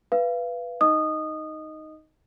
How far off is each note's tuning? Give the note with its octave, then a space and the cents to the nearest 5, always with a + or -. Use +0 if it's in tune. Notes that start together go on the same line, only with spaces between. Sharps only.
B4 +0 F5 -30
D#4 +0 D#5 +0 D#6 -20